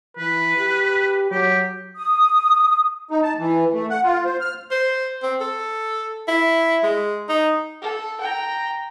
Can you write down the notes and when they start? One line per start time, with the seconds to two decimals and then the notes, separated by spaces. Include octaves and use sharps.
0.17 E3 B4
0.57 G4
1.31 F#3 G4
1.96 D#6
3.11 D#4
3.23 A5
3.39 E3
3.74 A3
3.90 F#5
4.04 F4
4.25 C5
4.40 F6
4.71 C5
5.23 C4
5.40 A4
6.28 E4
6.83 G#3
7.29 D#4
7.82 A4
8.21 G5 A#5